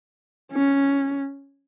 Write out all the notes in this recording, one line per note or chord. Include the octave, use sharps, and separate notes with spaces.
C#4